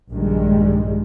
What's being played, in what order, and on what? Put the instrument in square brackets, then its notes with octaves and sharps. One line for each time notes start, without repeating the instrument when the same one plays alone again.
[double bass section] A#1 G2 D#3 G3 G#3